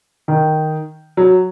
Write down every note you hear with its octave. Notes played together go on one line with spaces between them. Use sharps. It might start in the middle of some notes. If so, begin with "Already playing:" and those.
D#3
F#3